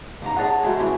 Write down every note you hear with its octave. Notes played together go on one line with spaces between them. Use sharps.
C#2 G#2 A#5
G#4 C#5 D#5 F#5 A5
C#2 G#3 A3 F#4 G#5
A2 C#3 E3